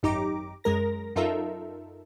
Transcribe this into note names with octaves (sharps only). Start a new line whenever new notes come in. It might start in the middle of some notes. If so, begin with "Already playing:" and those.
G#1 F#2 D#4 G4 A#5 D6
F#2 G#3 A#4 A#6
F#2 D#4 F4 A4 A#4 E5